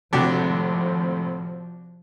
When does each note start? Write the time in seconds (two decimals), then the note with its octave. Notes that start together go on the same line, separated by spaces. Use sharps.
0.13 G#1 A2 C3 F3 D4 F#4 G4